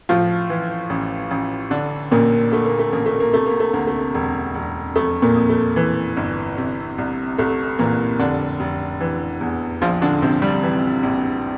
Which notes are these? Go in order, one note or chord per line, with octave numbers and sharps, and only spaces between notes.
A2 F3 F4
E3
A1
A1
D3 D4
A1 A#2 A#3
D3 A3
A#3
A3
A1 A#3
A3
A#3
C3 A3
A#3
A3
D2 A#3
A3
E1
E1
F2 A3
A#2 A#3
F2
A3
E3
G1
C3
C2
C2 A3
A#2 E3 A#3
F1 D3 D4
F1
E3
E2
A#1 F3 F4
D3 D4
A#1 C3 C4
G3
E3
A#1